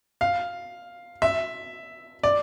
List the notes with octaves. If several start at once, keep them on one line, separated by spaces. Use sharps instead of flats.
F5
E5
D5